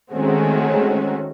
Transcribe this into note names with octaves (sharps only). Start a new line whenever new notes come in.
D#3 G#3 A3 C4 C#4 F#4